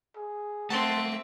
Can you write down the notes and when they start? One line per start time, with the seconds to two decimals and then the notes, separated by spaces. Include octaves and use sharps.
0.16 G#4
0.70 A3 A#3 C4 E5 F#5 A5 C6